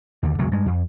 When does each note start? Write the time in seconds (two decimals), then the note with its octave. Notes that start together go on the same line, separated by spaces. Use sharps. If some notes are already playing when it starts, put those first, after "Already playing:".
0.23 D#2 D3
0.38 E1 C#2 F#2 F#3
0.51 G2 G#3
0.66 F2